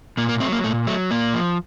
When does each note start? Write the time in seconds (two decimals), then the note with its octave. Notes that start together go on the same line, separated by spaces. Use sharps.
0.17 A#2 A#3
0.29 A#3
0.40 F#3 A3 C4
0.52 A#3
0.64 A#2 A3
0.87 F#3 A3
1.11 A#2 A#3
1.34 F3